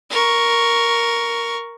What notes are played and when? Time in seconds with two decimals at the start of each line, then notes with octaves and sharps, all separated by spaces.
0.10 A#4 C#6